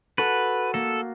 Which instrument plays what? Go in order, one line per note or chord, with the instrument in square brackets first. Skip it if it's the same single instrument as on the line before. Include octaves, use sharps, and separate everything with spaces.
[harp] F#4 A4 [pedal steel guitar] B4
[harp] A#3 [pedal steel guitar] A4